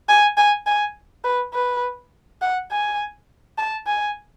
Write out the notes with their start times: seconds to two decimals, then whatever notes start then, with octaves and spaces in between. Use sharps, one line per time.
0.09 G#5
0.37 G#5
0.66 G#5
1.24 B4
1.54 B4
2.42 F#5
2.71 G#5
3.58 A5
3.87 G#5